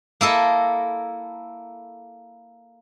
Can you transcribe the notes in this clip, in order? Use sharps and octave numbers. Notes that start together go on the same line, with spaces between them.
A#3 E4 A4 D#5